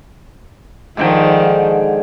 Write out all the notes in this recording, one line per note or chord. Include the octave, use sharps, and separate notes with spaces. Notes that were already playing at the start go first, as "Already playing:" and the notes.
G#2 D3 D#3 F3 G5